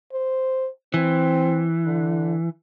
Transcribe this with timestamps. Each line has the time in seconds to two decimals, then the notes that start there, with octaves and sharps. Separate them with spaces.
0.13 C5
0.94 E3 C4
1.85 D3